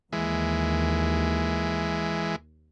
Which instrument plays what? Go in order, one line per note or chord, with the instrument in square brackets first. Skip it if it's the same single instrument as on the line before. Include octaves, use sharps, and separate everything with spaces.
[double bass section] D#2 [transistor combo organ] E3 G#3